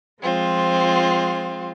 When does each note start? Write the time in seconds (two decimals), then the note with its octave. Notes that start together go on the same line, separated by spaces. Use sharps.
0.21 F3 G#3 C4 F4